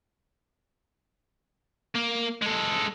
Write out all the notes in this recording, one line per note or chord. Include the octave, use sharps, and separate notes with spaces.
A#3
G#3 A4